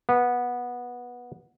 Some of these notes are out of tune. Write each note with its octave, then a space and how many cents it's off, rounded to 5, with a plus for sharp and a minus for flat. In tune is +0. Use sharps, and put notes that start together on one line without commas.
B3 -15